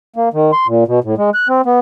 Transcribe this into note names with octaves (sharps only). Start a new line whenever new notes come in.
A#3
D#3
C6
A#2
B2
A2
G#3
F#6
C4
B3